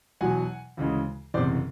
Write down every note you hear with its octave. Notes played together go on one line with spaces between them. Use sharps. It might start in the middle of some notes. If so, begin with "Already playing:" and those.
E2 B2 F#3 F#5 G#5
D2 C#3 E3 G#3
F#1 E2 C3 C5 D5